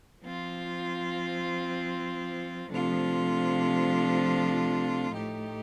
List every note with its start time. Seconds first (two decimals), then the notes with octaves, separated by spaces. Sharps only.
0.22 F3 C4 F4
2.69 C3 F3 A3 D4 F4
5.16 A2 A3 D#4 G4